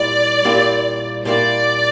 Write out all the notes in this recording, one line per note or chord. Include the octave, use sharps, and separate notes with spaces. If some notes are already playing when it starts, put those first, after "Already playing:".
Already playing: A#2 G3 E4 G4 D5
A#2 G3 A#3 E4 G4
A#2 G3 A#3 E4 G4 D5